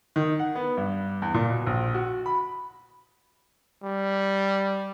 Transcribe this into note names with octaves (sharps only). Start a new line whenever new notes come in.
D#3
F#5
B3
G2
E2
A#2
B2
A#1
F#4
B5
G3